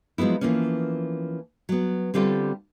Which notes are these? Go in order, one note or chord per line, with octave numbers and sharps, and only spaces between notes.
F3 F#3 G#3 B3 E4
E3 F3 A#3 B3 C#4
F#3 B3
D3 G3 C4 F4 G4 A4